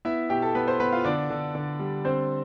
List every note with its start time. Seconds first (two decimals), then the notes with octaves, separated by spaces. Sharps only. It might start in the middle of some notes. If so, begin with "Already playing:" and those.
0.05 B3 E4 E5
0.30 B2 G4 G5
0.42 A4 A5
0.55 B3 B4 B5
0.68 C5 C6
0.80 B3 B4 B5
0.93 F4 F5
1.05 D3 D4 D5
1.30 D3
1.55 D3
1.79 G3
2.05 D3 C4 C5